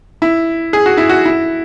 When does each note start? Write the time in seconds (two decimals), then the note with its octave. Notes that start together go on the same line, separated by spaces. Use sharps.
0.22 E4
0.73 G#4
0.86 F#4
0.97 E4
1.09 F#4
1.25 E4